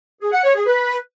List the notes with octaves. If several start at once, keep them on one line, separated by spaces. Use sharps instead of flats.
G#4
F#5
C#5
G#4
B4